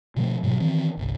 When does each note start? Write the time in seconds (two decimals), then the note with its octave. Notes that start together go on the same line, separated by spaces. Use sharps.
0.17 B2 D3 F3 A3
0.43 G#2 B2 F#3 G3
0.60 D#3 E3 C4
0.97 G1 C2